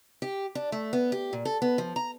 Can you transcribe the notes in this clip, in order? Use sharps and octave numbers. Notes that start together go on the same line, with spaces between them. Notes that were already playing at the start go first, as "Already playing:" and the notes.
G4
D4
A3
B3
G4
A#2
A4
B3
F3
A#5